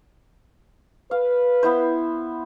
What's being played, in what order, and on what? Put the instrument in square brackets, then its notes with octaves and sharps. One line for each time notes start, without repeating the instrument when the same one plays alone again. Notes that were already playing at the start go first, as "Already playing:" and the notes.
[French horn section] B4 [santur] F5
[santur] B3 E4 C5